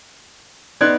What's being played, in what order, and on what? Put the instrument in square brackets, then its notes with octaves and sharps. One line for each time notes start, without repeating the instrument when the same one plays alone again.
[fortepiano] B3 D#4 [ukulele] D5 [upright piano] C6 F#6 G#6